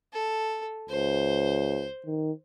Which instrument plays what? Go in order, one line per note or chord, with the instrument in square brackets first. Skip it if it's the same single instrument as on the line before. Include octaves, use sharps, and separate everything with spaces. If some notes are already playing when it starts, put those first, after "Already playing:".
[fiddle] A4
[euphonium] C#2 [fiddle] C5
[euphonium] D#3